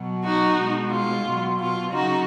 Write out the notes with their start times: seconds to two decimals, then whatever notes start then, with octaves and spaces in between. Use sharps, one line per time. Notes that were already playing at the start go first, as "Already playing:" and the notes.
Already playing: B2 F#3
0.23 D#4 F#4
0.58 B2 G#3
0.91 F4
1.25 B2 F#3
1.60 F4
1.93 C#3 F#3 D#4 F#4